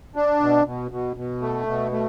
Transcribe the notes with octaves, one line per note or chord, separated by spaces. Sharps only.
D4
B2
B2
B2
B2
A3
B2
A3